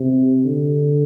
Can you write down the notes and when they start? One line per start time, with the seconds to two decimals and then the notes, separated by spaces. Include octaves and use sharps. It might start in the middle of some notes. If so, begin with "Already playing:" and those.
Already playing: C3
0.45 D3